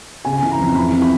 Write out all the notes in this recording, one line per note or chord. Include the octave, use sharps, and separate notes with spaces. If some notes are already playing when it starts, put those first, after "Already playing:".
C#3 G#5
E3
A#5
F2
E3 B5
C3
B5